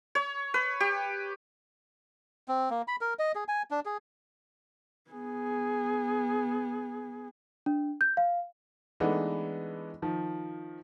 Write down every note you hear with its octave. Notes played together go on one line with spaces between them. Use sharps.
C#5
B4
G4
C4
A#3
B5
A#4
D#5
G#4
G#5
D4
G#4
B3 G#4
D4
G6
F5
E3 G#3 A3 B3 D4 D#4
D#3 F3